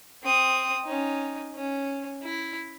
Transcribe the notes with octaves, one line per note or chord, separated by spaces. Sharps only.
C4 D#6
C#4 D#4
C#4
E4